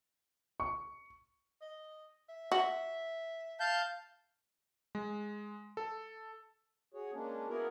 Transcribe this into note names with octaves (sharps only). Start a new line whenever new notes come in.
C#6
D#5
E5
F#4 E5
F5 A5 G6
G#3
A4
F#4 G#4 C#5
G#3 A#3 C#4 D4
A#3 B3 E4 F#4 G#4 A#4